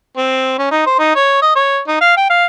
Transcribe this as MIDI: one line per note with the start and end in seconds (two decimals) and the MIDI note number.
0.17 0.57 60
0.59 0.67 61
0.71 0.86 63
0.86 0.98 72
0.99 1.14 63
1.16 1.39 73
1.42 1.55 75
1.56 1.79 73
1.88 1.99 63
2.01 2.14 77
2.17 2.25 79
2.30 2.46 77